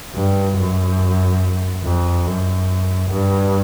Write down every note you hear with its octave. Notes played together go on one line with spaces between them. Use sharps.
G2
F#2
F2
F#2
G2